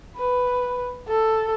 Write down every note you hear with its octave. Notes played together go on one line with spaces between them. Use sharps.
B4
A4